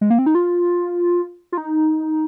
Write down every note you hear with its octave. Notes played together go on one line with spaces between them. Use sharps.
G#3
A#3
C4
D#4
F4
F4
D#4